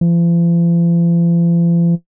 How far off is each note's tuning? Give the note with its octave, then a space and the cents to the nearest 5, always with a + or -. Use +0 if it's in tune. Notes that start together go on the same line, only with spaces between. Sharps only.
F3 -45